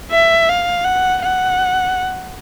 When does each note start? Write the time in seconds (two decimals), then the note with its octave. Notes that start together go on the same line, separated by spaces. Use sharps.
0.11 E5
0.49 F5
0.85 F#5
1.22 F#5